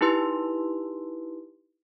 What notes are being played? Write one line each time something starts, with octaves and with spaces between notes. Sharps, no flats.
D#4 E4 G4 B4 C6